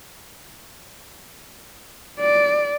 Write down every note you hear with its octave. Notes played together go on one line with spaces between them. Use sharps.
D5